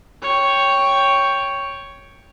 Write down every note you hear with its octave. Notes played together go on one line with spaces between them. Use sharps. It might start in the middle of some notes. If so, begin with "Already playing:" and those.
C#5 G5